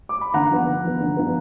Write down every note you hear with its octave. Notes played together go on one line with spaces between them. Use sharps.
D6
B5
D3 F#5 A#5
F3 B3
D3
F3 B3
D3
F3 B3